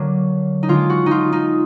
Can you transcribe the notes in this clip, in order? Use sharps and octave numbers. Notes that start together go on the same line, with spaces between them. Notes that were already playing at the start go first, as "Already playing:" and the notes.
Already playing: D3 F#3 A#3
D#4
D3 G#3 F4
F#4
D#4 F4
D#4